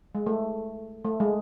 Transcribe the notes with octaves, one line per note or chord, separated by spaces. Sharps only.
G#3
A3
A3
G#3